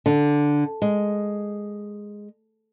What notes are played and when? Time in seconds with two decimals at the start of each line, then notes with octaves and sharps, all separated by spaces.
0.06 D3
0.82 G#3